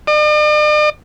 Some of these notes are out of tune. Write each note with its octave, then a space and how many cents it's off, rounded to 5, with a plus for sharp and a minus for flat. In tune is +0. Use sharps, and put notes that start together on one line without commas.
D5 +45